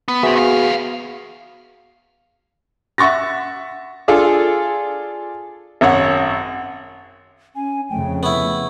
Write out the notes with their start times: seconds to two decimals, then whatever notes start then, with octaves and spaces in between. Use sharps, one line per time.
0.08 B3
0.23 B3 F#4 G#4 C5 E5
0.36 E2 F5
2.98 E5 F#5 C#6 A6 A#6
4.08 D4 F4 G#4 A4
5.81 G#1 F#2 C#5 F#5
7.56 C#4 G#5
7.90 F2 C#3 A3 G5
8.23 B3 E4 C#6